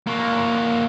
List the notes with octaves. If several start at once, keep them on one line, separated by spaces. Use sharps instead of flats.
A#3 F#4